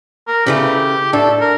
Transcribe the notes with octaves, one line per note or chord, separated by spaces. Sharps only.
A#4
C#3 E3 A3 G4
A2 D4 A4
A#4